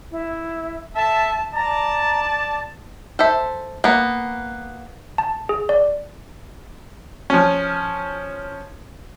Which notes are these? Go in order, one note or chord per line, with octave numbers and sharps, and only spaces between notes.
E4
A4 E5 A5
D5 A5 A#5
A4 C5 E5
A#3 B3
A5
G#4
D5
F3 C#4